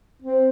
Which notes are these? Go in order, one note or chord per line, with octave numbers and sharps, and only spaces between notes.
C4